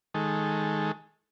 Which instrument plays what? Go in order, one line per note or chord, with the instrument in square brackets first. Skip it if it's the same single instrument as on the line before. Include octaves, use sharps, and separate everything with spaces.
[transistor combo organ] D#3 G#3 A4